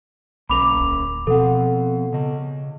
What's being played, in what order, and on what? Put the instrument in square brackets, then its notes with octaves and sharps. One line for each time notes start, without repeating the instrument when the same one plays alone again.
[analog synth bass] B1 [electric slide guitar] A#3 C#4 A#4 [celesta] B5 D6 F7
[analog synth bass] D1
[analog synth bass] B2 [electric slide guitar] F3 C4 [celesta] A4 F#5
[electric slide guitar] C#3 D#5